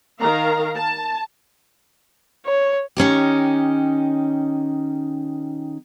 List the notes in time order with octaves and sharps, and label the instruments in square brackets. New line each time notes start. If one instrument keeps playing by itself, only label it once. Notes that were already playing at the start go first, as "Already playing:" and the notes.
[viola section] D#3 A#4 F5 A#5
A5
[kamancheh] C#5
[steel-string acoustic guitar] D#3 C#4 D#4 G4